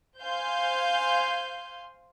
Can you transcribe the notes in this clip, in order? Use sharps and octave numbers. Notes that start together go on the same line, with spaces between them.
C5 F5 G#5 C6 G6